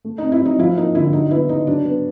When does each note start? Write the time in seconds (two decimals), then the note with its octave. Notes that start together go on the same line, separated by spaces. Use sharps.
0.05 A3
0.18 C4 D#4
0.32 E4
0.41 F#3 D#4
0.58 F3 E4
0.77 A#3 D#4
0.95 D3 E4
1.13 F#3 D#4
1.31 B3 E4
1.49 C#3 D#4
1.67 F#3 D4
1.85 B3